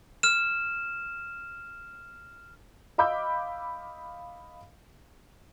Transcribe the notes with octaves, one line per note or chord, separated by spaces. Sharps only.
F6 E7
D#5 F5 B5 D6 E6 G6